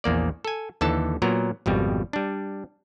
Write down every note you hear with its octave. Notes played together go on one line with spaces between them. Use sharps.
A#1 E2 A#3 D5
A4 G#5
D#2 D3 E3 A4 A5
A#2 F#3 B3 A#4 A#5
G#1 F2 B2 G3
G3 D4